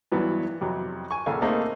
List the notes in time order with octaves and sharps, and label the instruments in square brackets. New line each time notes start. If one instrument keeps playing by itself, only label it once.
[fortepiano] G2 E3 F#3 B3
F2 C3 F#3
G#5 C#6
A#1 C#3 A4 F5 G#5
A3 A#3 C4 D#4 G#4